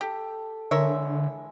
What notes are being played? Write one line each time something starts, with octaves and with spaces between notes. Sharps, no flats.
G4 A4
D3 E3 G#3 A#4 C#5 E5